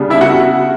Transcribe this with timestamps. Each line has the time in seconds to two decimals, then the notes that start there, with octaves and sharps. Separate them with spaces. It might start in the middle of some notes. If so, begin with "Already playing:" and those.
Already playing: C#3 G3 B3 D4
0.10 E4 E5
0.21 F#4 F#5